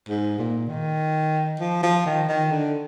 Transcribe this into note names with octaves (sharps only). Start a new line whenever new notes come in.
G#2
A#2
D#3
F3
F3
D#3
D#3
D3